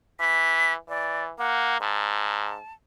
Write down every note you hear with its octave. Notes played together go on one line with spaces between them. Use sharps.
E3 B6
E3 D5
A#3 F#5
G#2 A5